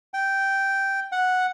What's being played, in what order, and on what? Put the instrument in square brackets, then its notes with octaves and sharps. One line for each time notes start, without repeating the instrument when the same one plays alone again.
[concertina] G5
F#5